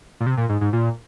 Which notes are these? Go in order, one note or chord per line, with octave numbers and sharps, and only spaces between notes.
A#2
C3
A#2
G#2
G#2
A#2